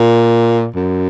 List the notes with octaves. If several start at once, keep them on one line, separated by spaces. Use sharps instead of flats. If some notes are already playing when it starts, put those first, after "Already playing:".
Already playing: A#2
F#2